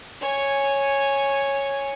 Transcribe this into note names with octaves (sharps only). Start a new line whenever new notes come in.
C#5 G#5